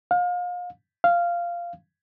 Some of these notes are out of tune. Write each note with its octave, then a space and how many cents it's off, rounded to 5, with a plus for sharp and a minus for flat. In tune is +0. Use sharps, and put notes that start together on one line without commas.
F5 +35
F5 -10